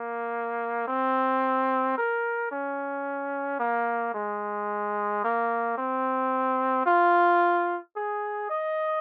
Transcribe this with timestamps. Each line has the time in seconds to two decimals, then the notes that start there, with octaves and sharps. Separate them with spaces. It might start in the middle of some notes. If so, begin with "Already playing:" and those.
Already playing: A#3
0.88 C4
1.98 A#4
2.52 C#4
3.60 A#3
4.14 G#3
5.24 A#3
5.78 C4
6.86 F4
7.96 G#4
8.50 D#5